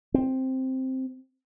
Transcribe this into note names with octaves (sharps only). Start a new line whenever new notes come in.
C4